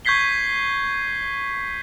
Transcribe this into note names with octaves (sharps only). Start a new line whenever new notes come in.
C#6 G6 G#6 B6 C7 G7